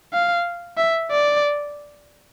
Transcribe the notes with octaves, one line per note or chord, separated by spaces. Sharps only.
F5
E5
D5